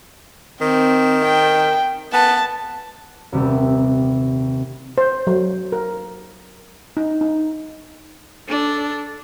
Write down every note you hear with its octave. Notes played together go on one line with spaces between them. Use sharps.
D#3 C4
G5
B3 A5
D#1 C3 G3 G4 E5
C5
F#3
A#4
D#4
D#4
D4 A4